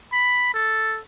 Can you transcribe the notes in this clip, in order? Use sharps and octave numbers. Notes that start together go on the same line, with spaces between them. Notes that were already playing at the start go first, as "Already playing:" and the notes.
B5
A4